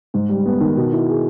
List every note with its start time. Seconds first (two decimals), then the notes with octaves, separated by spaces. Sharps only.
0.14 G#2
0.29 G3
0.46 B3
0.61 D#3
0.77 B2
0.92 E4
1.09 G#4